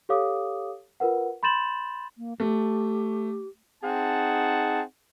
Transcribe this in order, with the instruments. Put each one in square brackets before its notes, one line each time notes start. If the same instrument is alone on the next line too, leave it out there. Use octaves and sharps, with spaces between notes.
[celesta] G4 A4 C#5 F5 D6 D#6
F4 A#4 B4 F#5
B5 C6 G6 A6 E7 F#7
[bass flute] A#3
[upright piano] A3 [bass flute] G4
[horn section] C4 D#4 G#4 F#5 A5